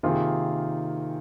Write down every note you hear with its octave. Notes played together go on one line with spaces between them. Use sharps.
C3 D#3 A#3 F4 G#4